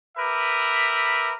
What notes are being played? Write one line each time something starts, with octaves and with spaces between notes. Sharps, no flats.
G4 A#4 B4 E5 B5